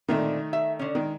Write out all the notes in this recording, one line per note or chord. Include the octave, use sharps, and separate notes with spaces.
A#2 D3 D#3 A3 C4
E5
D3 C#4
D#3 G#3